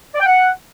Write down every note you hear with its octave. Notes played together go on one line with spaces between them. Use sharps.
D5
G5
F#5